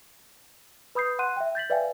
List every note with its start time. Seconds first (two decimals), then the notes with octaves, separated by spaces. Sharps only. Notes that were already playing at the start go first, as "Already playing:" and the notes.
0.95 B4 B5 D#6 G6 C7
1.19 F#5 C6 F#6 D#7
1.37 E5 G5
1.55 G6 A6 B6 F#7
1.70 B4 D5 E5 F5 G5 G#5